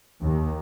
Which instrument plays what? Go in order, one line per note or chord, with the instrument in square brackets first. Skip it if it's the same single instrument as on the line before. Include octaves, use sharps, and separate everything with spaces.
[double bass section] D#2